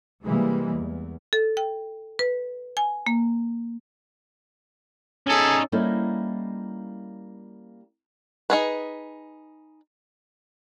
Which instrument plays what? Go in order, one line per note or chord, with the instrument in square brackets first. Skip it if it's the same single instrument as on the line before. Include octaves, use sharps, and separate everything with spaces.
[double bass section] C3 E3 G3 G#3 A#3
E2
[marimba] A4
G5
B4
G#5
A#3
[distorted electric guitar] C#4 D#4 [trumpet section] G#4 A4
[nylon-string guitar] G3 A#3 C#4 D#4 E4 A4
[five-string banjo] D#4 G#4 B4